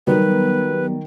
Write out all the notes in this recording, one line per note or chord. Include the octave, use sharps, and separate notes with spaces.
D#3 F#3 G3 B3 A#4 B4